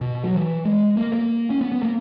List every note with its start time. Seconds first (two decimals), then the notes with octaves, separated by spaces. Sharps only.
0.01 B2
0.24 F#3
0.33 E3
0.65 G#3
0.97 A#3
1.13 A#3
1.50 C#4
1.61 B3
1.72 B3
1.83 A#3